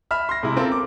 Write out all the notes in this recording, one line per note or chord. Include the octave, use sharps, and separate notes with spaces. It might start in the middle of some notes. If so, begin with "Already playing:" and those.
E5 B5 F6
C6 A#6
C3 G#3 E4
C4 F4 A4 A#4
D6